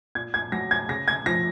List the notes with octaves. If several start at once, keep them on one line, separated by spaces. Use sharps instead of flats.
A#2 G#6
G#6
F#3 A#6
G#6
C#3 A#6
G#6
F3 A#6